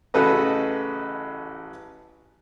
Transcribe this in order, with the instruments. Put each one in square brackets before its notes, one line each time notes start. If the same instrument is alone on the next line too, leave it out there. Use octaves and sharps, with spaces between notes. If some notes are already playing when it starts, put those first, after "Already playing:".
[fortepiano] A1 C#3 F#4 A4 B4 D#5